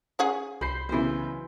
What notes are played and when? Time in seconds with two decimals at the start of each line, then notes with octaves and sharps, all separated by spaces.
0.19 C#4 G#4 F#5
0.61 C2 C5 B5 G6 C7
0.89 B1 C#3 E3 C5